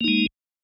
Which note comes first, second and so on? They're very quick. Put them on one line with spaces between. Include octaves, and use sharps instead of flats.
A#3 D#4 G#3